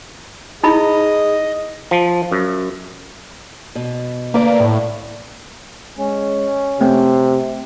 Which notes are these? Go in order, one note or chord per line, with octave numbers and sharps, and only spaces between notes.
D#4 E4 G#4 D#5 B5
F3
F#2
B2
D2 A#3 B4 D5
A2
G#3 C#4
C3 A3 C4 G5